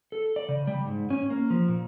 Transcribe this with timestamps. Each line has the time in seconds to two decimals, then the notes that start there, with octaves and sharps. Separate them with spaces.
0.12 A4
0.36 D5
0.49 C#3
0.67 G3
0.85 G#2
1.10 C#4
1.30 A#3
1.50 F3
1.68 A#2